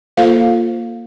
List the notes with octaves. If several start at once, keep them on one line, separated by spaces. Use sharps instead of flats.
A#3 F4 A4 C5 F5